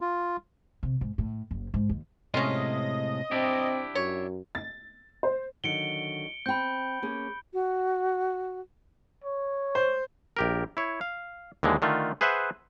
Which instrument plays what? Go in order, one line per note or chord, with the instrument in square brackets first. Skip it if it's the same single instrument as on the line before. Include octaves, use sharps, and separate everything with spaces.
[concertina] F4
[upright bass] C3
G#2
A2
F#1
G#2
D#2
[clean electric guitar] A2 C3 G#3 [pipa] C#4 F4 [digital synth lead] D#5
[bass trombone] C4 [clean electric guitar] D4 E4 G4
[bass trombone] F#2 [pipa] C#5
[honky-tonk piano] A6
C5
[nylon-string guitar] D3 D#3 F#3 [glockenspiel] C#7 D7 G7
[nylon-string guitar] C4 G5 [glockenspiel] B5 G6
[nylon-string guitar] A#3 C#4 G#4
[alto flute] F#4
[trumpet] C#5
[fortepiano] C5
[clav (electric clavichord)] A#1 G4 A#4
E4 C#5
F5
D#2 D3 E3 G#3
D3 D#3 A3 F4
G#4 B4 C5 E5 F#5